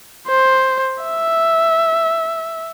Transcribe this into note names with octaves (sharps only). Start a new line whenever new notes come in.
C5
E5